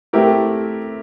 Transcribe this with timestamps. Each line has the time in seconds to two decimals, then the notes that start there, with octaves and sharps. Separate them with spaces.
0.13 A3 C4 E4 G4 A#4